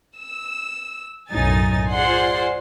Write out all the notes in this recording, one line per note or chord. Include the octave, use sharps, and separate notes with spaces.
E6
B1 F#2 A2 D#4 G#5 A6
F4 G#4 C5 D5 F#5 C6